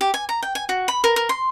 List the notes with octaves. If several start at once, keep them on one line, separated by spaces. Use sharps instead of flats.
G4
G#5
A#5
G5
G#5
F#4
B5
A#4
A#4
C6